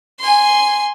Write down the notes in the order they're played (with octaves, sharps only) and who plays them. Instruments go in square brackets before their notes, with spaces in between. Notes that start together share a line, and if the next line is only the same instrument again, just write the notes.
[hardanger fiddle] G#5 C6